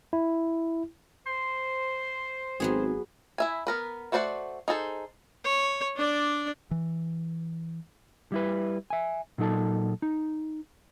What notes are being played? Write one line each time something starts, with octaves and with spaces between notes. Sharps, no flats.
E4
C5 C6
G#1 F#3 B3 G#4
E4 E5 G#5
B3 A#4 B4
A3 F#4 C5 D5 F#5
D#4 G#4 A4 C5
C#5
D4 D5
E3
G3 E4 B4
E5 G#5
A#2 F#3 D#4 A4 A5
D#4